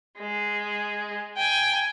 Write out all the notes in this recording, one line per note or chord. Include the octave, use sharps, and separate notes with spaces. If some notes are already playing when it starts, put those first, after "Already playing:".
G#3
G5 G#5